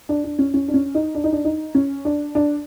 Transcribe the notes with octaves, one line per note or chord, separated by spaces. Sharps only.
D4
D4
C#4
C#4
D4
C#4
D#4
D4
D#4
D4
D#4
C#4
D4
D4